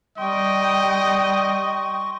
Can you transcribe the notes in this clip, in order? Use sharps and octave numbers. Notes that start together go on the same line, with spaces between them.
G3 D#5 G5 C6 C#6